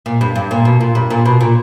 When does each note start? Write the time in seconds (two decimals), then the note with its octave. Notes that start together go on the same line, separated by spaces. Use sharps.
0.06 A#2
0.21 G2
0.36 G2
0.51 A#2
0.65 B2
0.81 A#2
0.95 G2
1.10 A#2
1.25 B2
1.41 A#2